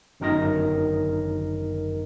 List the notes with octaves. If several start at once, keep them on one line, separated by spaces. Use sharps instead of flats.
G1 F#2 D#3 A#4 D#5 A#6